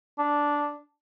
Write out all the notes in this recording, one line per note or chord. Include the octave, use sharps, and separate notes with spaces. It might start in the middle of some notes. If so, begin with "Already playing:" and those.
D4